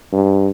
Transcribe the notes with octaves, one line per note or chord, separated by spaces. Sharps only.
G2